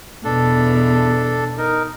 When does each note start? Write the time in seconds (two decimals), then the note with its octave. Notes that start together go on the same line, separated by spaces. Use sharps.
0.24 E2 B2 D4 A4
1.58 D#4 A#4